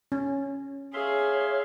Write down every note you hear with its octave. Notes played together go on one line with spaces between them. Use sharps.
C#4
G#4 C#5 E5 F5 C6